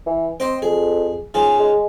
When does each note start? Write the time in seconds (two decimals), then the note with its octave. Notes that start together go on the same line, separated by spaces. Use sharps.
0.07 E3
0.40 C4 C5 D#5 G5
0.62 F2 G#4
1.34 G#2 C#3 F4 G#4
1.59 G#3